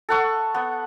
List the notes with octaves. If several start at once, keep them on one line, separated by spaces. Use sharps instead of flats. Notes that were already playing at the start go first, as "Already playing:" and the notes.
A4 F#5 C#6
B3